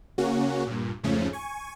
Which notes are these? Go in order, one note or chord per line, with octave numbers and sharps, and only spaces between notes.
C#3 A#3 C#4 F#4
G2 A#2
F2 G#2 C#3 F3 A3 C#4
G#5 C#6